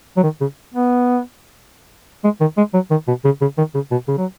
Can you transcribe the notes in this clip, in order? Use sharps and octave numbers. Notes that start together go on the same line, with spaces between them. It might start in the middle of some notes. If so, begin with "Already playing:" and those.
F#3
D#3
C#3
B3
G#3
D#3
G#3
F#3
D#3
B2
C#3
C#3
D#3
C#3
B2
C#3
F#3